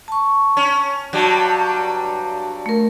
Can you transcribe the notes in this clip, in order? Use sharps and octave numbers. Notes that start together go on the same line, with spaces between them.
A5 C#6
C#4
G2 F#3 G3 F#4 A5
A3 A#4